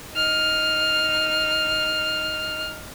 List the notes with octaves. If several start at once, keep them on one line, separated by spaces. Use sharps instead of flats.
D#4 F6